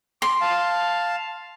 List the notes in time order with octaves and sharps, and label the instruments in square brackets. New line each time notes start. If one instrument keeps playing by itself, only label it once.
[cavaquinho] C6 [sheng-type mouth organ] D6
[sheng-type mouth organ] F5 A5